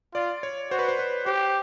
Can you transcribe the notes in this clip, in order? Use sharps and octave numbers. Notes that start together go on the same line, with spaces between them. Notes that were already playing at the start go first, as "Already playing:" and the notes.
F4 D5
C#5
F#4 C5
B4
C5
B4
G4 C5